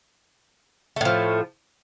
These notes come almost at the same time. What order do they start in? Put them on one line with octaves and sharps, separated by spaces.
A3 A2 F3